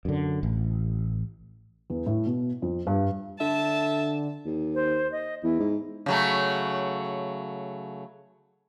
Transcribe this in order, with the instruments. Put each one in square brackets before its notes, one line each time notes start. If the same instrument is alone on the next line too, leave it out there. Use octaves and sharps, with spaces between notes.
[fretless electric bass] F#2 D3
A1
[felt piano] E2
A2
B2
F2
G2
[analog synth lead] D3 [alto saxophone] E5 [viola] A5
[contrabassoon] D#2
[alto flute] C5
D#5
[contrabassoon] E2 [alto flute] E4
[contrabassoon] G#2
[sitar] C#3 F#3 A3